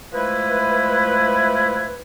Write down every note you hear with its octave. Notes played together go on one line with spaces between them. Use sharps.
F3 G#3 A3 E4 B4